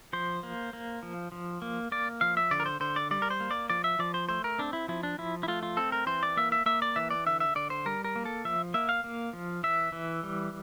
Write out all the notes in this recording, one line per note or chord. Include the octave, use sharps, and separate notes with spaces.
F3 C5
A#3
A#3
F3
F3
A#3
A#3 D5
F3 F5
E5
D3 D5
A#4
C5
D3 C5
D5
G3 D5
A#4
C5
A#3
D5
F3 D5
E5
F3 D5
C5
A3 C5
A#4
C4 D4
E4
F3 E4
D4
F3 E4
E4
A3 F4
F4
C4 A4
A#4
E3 C5
D5
A#3 E5
E5
A#3 E5
D5
E3 E5
D5
D3 E5
E5
D3 D5
C5
G3 A#4
A#4
A#3
A4
F3 E5
A#3 E5
F5
A#3
F3
E3 E5
E3
G3